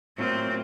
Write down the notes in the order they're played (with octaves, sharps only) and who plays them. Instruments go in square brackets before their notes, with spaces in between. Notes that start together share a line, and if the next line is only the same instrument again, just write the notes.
[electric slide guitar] A2 F#3 A#3 F4 [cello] C4